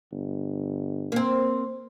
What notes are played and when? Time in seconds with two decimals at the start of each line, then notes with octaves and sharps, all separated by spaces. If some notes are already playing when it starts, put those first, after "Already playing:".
0.12 G1
1.12 A#3 C4